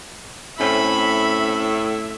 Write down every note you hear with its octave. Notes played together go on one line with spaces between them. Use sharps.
A2 C4 C#4 E5 B5